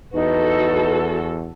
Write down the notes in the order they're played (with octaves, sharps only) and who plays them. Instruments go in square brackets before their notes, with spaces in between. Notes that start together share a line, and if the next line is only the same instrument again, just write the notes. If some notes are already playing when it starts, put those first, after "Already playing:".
[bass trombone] E2 [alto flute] D#4 [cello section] F#4 A4 [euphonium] B4